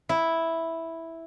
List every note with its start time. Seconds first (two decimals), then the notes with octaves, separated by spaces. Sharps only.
0.09 E4